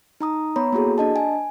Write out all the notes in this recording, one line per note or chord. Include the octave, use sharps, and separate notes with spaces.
D#4 A#5 D#6
B3 C#5 A#5 B5
A#3 E4 F#4 G#4 A4
D4 D#5 A5
G#5